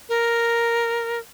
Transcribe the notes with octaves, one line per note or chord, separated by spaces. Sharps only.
A#4